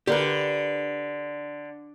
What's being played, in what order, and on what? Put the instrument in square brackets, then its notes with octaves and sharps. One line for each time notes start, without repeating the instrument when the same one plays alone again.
[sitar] D3 [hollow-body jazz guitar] G4 A#4 B4